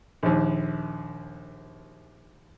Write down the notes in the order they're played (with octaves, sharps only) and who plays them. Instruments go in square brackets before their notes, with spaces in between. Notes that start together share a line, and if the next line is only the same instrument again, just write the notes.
[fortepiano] A#1 D#2